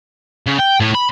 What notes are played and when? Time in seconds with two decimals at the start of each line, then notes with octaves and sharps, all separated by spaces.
0.47 C#3
0.59 G5
0.80 A2
0.95 B5